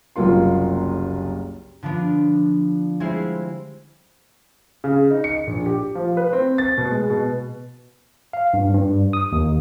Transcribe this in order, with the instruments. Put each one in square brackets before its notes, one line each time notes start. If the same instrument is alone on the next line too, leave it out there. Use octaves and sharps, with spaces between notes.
[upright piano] F#1 C2 F#3 A#3 F4 C6
[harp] D3 F3 B3 D4
G3 G#3 C4 E4 G#4
[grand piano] C#3
D#4
C#7
A#1
G4
F3
B4
C4
A6
B2
G#3
B2
[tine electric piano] F5
G2
G2
D#6
D#2